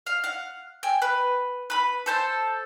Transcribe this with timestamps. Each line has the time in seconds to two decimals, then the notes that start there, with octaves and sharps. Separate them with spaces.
0.06 F5
0.24 F5 F#5
0.83 G5 G#5
1.02 B4
1.70 B4 B5
2.06 A4 C5 A5